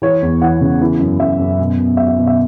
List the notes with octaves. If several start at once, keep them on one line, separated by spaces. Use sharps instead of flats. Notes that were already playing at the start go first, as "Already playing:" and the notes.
E3 C#5
E2
E3 F#5
C#3
E3
F#2
F#2 E5
F#2
B2
B2
B2 E5
E5
B2
E5